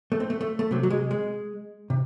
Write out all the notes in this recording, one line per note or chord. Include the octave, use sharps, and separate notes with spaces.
A3
C4
A3
A3
A3
C3 F#3 C4
F#3
G#3
G#3
C3